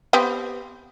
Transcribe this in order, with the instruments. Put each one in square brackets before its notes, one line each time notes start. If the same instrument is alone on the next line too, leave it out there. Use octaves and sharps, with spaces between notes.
[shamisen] B3 C4 G4